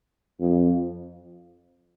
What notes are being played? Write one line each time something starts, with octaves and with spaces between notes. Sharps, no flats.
F2